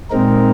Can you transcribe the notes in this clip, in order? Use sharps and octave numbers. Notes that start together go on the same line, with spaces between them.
A#2 G#3 C4 D#4 A#4